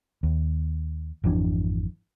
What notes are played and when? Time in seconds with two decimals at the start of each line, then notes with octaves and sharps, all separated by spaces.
0.23 D#2
1.24 G#1 F2 E3 D4